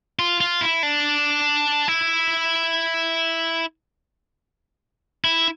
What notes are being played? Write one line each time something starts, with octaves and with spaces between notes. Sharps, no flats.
F4
F4
E4
D4
E4
E4